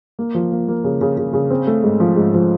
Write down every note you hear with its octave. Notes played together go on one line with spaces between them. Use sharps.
A#3
F3
A#3
A#3
C#3
C#3
C#3
C#3
C4
A3
G#2
F3
G#2
F3